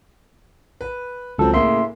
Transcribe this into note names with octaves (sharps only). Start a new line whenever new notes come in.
B4
C#2 F3 F#3 C4 A4
A2 C#3 A#3 E5 C6